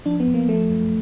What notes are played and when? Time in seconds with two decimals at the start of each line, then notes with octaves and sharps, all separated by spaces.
0.06 F3 D4
0.20 B3
0.27 F2
0.34 A#3
0.48 F3 A3
0.70 F#2